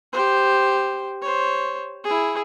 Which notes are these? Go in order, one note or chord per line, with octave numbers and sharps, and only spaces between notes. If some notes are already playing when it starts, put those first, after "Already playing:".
G4 C5
C5 C#5
E4 G#4